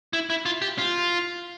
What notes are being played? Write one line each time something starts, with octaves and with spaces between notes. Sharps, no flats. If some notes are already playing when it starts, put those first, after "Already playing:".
E4
E4
F4
G4
F4